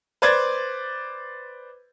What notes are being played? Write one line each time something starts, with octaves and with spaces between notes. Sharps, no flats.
B4 C5 D5 G#6 A6